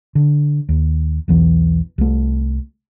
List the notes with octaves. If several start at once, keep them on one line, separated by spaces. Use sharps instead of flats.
D3
D#2
B1 E2 E3
C2 A3